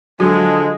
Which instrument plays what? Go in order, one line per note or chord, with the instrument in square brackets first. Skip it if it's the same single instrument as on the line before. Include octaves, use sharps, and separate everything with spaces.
[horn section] D3 F3 G#3 [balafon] F#3 F#4